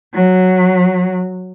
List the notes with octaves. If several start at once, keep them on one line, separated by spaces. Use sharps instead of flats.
F#3